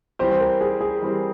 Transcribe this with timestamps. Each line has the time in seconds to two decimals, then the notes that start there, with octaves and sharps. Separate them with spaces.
0.19 E3 G3 C4 G4 C5
0.31 C5
0.40 A#4
0.61 G#4
0.81 G#4
1.02 E3 G3 C4 G4